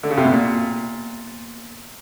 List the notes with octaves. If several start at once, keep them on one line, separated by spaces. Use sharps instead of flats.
D3
C#3
C3
B2
A#2